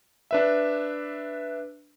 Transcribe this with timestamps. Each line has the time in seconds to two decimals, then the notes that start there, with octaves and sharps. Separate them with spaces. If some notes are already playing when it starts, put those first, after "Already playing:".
0.31 D4 B4 E5